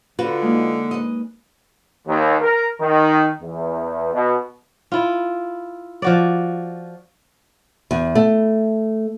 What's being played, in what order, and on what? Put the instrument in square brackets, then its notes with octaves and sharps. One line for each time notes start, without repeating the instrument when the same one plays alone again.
[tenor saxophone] D3 [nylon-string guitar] F4 F#4 B4
[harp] G#3 A#3 D#4
[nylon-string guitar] B4 D#5
[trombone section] D#2
A#4
D#3
E2
B2
[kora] E4 F4
F3 F#4 D5
[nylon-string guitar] E2
A3